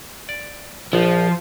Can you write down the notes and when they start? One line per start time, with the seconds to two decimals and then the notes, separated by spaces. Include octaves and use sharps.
0.29 D5
0.93 A#1 F3